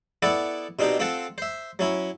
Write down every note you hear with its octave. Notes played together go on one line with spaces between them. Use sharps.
B3 E4 A4 D5 F#5
B2 C4 D4 D#4 G4
C4 F4 A4 F#5 A5
C5 E5
F#3 C#4 E4